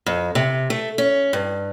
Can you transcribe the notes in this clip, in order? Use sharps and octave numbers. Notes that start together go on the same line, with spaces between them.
F2
C3
A3
C#4
G2